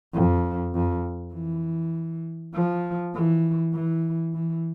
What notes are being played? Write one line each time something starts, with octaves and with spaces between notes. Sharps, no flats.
F2
F2
E3
F3
E3
E3
E3